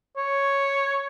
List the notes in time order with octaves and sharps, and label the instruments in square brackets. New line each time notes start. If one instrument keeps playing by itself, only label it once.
[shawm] C#5